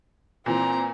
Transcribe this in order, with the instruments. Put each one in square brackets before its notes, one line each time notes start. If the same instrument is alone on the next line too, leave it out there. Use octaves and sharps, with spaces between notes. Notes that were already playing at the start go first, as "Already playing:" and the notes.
[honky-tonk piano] A#2 E3 [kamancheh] C4 A#5